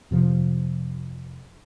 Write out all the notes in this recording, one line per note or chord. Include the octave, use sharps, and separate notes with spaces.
F2 C3 F3